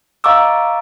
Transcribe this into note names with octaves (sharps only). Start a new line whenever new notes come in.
D#5 F5 A#5 C#6 D6 E6